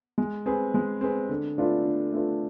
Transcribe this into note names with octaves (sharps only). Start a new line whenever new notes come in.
G#3
C4 G#4 B4
G#3
C4 G#4 B4
D3
A3 D4 F4 B4
D3
A3 D4 F4 B4